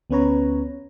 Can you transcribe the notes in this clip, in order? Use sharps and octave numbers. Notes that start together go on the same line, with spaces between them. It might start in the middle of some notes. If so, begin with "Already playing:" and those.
D2 B3 C#4 B4 C#5 A#5